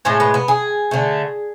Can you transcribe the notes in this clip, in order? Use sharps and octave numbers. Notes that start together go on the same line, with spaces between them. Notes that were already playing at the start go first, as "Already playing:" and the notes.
A2 G#3 A3
B3
B3
G#4
D3 A3